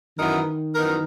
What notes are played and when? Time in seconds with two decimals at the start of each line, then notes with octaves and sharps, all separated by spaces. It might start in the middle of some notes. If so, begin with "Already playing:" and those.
0.18 F#2 D#3 E3 B3 D#4 A#4
0.75 F#2 E3 B3 D#4 A#4